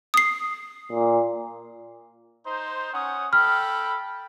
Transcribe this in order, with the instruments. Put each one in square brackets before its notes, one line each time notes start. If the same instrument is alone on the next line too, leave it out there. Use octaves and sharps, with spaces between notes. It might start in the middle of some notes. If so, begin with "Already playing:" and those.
[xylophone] D#6 C7
[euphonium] A#2
[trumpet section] D#4 C5
C#4 F#5 D#6
[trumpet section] A4 G5 B5 [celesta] F6